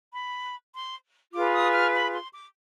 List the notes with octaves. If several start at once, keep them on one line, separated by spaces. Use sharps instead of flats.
B5
C6
F4 G#4 B4 D6
D#6
F6
B5
C6
D6